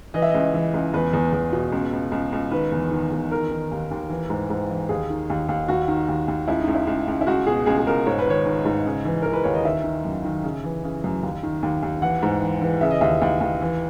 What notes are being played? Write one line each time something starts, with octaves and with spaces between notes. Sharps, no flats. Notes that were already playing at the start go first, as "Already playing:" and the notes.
E3 D#5
E5
C#2 D#5
E3
C#2
E2 B4
E2
E2
B2
C#2
C#2
C#2
C#2
D#3 B4
E2
D#3
E2
D#3 A#4
D#3
D#2
D#2
E3
G#2
G#2
E3
D#2 G#4
D#3
D#2
D#2
D#2 F#4
D#3
D#2
D#2
C#2 E4
D#4
C#2
E4
C#2
C#2
E4
C#2 F#4
B2 G#4
C#2 G#4
G#4
C#2 A#4
G#2 C#5
B4
D#3 C#5
D#3
G#2
C#3
E3
E3 A#4
B4
D#2 C#5
D#5
D#3 E5
D#3
F#2
D#3
C#3
E3
C#3
F#2
D#2
D#3
D#2
D#2
E3 F#5
G#2
E3
E3
C#3 E5
D#5
D#2 E5
D#2
D#2
E3